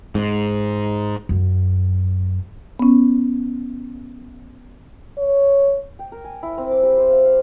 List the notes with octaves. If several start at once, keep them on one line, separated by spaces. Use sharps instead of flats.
G#2
F#2
B3 C#4
C#5
G5
A#4
G#5
E4
C4
D6
G4
C5
F5
F5